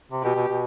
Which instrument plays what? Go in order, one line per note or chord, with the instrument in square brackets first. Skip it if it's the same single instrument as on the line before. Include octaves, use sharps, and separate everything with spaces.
[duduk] C3
[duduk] B2 [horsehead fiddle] G4
[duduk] B2
B2